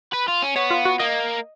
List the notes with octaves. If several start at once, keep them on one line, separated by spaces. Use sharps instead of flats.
B4
F4
C#4
B3 C#5
F4
F#4
A#3 D#5